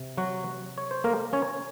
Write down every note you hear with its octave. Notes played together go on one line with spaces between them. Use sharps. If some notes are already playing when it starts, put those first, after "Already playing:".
Already playing: C3
F#3 F#4
C#5
C5
A#3 A#4
C#4 C#5